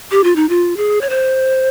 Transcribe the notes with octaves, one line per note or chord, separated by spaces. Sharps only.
G4
F4
D#4
F4
G#4
C#5
C5